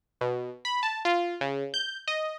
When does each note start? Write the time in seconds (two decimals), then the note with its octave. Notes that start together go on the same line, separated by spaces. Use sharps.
0.21 B2
0.65 B5
0.83 A5
1.05 F4
1.41 C#3
1.74 G6
2.08 D#5